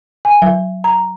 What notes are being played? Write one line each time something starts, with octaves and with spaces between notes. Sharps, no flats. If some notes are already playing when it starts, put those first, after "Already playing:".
G#5
F#3
A#5